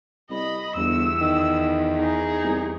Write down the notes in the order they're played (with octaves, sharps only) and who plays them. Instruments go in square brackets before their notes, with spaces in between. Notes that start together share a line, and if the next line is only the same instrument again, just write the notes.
[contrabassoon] C2 [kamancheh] D#5 B5
[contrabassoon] G1 [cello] E2 [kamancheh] E6
[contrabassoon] D#3
[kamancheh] D#4 G#4
[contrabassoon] C2